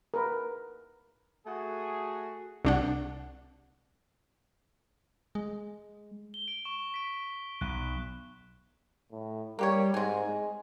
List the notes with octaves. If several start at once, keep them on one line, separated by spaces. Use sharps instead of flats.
A#4 B4 B5
A3 F#4 G#4
C2 D4 F#5
G#3
G7
D7
C#6 E7
C#6 B6 D7
B1 F#6
A2
G3 A#3 G4 C#5
G#2 C4 G#5
G#3